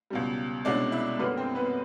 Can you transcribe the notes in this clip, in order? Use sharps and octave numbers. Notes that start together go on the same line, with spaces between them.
C#2 B2 G3
C2 B2 G#3 C#4 D4 D5
E4 E5
F#2 D3 G3 A#3 B3 B4
C4 C5
B3 B4